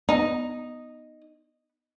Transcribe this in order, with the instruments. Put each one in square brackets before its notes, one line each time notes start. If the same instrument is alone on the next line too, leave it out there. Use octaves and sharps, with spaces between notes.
[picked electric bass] B3 [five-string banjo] D#4 D#5